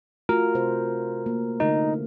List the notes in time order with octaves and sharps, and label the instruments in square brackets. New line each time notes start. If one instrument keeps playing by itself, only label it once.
[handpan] A3 F4 F#4 [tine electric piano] A#4
[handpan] C3 C5
A#3
[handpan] D3 A3 A#4 [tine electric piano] D#4